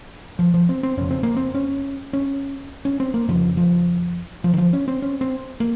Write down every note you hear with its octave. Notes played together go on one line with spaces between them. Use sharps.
F3
F3
C4
C4
F2 C#3 C#4
C4
A#3
C4
C#4
C#4
C#4
C4
A#3
F2 C#3 F3
F3
F3
D#3
F3
C#4
C4
C#4
C4
A#3